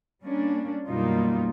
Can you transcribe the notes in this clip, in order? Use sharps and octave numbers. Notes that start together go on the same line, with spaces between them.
G3 A#3 C#4 D4
F#2 B2 G3 A#3 D#4 F4